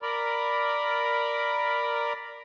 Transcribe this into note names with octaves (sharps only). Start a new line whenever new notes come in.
A#4 D5 A#5 B5